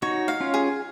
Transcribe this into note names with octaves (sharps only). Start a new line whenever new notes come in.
D#4 F#4 C#5
F5
C#4 F4
G#4